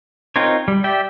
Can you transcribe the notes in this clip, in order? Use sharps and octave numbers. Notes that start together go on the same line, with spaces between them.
C4 D#4 F4 A#4 C#5
G3
G4 D5 E5 G5